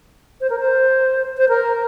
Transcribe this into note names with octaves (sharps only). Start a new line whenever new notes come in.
C5
A#4
C5
C5
A#4